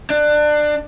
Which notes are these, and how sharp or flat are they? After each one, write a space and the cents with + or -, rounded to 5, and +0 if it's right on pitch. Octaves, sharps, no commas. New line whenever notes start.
D4 +25